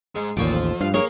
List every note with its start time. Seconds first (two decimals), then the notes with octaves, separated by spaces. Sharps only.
0.15 G#2 G#3
0.37 A1 D#2 A#2 F3 C#5 G5
0.53 F2
0.81 G2 F5
0.94 A#3 G#4 A#4 C#5